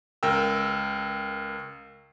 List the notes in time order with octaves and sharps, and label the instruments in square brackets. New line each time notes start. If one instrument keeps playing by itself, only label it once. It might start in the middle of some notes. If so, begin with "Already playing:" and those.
[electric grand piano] C#2 A#4 G5 E6